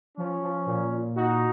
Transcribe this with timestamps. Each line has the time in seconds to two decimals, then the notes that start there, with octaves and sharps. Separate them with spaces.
0.17 F3 C#4
0.42 F3
0.66 A#2
0.91 A#2
1.16 D#4 F#4